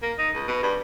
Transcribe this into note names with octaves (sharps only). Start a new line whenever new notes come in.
A#3
D#4
C#2
B2
G2